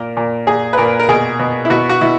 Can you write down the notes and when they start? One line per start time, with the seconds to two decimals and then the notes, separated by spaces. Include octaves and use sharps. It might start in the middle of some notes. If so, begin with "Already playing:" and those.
Already playing: A#2 A#4
0.17 A#2
0.47 A#2 G#4
0.73 B4
0.77 A#2 A#4
0.99 A#4
1.08 B2 G#4
1.39 B2
1.65 E4
1.70 B2 F#4
1.89 F#4
2.01 B2 E4